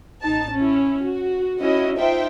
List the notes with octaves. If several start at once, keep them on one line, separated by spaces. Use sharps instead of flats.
A1 D#4 A5
C#4 E4
F#4
C#4 E4 F#4 D#5
D#4 F4 C5 E5 G5